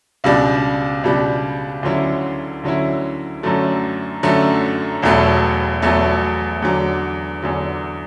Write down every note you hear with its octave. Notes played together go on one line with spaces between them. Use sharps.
C#2 B2 G3 D4
C#2 B2 G3 D4
D2 D3 F#3 C#4 E4
D2 D3 F#3 C#4 E4
F#2 D3 F#3 A3
F#2 D3 F#3 A3
E1 E2 B2 F#3 A3
E1 E2 B2 F#3 A3
E2 D3 F#3
E2 D3 F#3